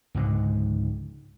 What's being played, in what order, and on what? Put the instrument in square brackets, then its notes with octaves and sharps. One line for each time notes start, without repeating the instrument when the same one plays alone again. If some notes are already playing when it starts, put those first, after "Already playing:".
[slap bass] C#2 G#2 B2 D3